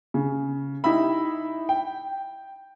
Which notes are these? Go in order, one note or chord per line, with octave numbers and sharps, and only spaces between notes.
C#3
D#4 E4 G4 E5 B5
G5